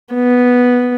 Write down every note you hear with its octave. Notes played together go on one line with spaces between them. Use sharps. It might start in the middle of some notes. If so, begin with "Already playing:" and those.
B3